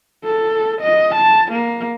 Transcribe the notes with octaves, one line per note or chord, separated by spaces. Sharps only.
A4
D#5
A5
A#3